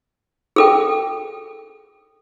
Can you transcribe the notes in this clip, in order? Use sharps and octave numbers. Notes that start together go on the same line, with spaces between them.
G#4 A4 G5